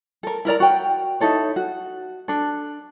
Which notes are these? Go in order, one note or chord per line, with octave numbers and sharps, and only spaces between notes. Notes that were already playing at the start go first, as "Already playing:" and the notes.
A4 A#4
E4 A#4 D5 A#5
F#4 G5
D#4 E4 A4 C#5
F#4
D4 A4